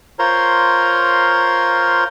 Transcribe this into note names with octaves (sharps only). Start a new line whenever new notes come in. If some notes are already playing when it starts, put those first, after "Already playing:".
F4 A#4 C5 C#5 A#5 C6